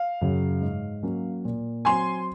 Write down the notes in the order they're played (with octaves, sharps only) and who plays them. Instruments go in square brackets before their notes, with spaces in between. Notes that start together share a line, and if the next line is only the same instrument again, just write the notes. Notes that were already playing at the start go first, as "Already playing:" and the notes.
Already playing: [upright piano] F5
[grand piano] F#2 C#3 F#3
G#2
F#3 A#3 C#4
A#2
[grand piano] F#3 C4 F#4 [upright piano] G#5 C6